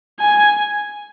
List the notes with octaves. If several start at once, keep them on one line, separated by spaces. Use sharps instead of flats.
G#5